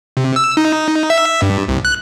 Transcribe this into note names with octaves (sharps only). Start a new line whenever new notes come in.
C3
E6
D#4
E5
G2
C2
F#6